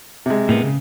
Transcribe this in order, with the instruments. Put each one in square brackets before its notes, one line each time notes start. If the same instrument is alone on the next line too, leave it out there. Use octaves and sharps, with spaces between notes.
[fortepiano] C3 G#3
[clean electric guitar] A2 A#3 B3
C#3